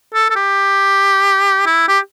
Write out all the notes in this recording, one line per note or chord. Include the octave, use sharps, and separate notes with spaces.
A4
A4
G4
E4
G4